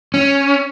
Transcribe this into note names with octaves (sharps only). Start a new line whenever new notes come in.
C#4